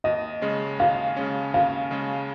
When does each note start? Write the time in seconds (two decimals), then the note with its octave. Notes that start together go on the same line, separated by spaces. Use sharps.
0.04 D#2 D#5
0.42 C#3 G#3 C#4
0.80 D#2 F5
1.17 C#3 G#3 C#4
1.54 D#2 F5
1.91 C#3 G#3 C#4